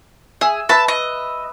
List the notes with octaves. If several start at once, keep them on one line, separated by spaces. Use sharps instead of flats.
G#4 E5
A4 B4 E5 A5
D#5